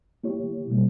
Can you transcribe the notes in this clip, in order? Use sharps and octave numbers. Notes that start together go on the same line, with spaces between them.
A#3 E4 G4 C#5
B2 G3 A#3